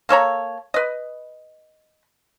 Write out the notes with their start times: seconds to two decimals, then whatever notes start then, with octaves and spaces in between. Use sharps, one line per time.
0.09 A#3 A4 C#5 A#5
0.74 B4 D#5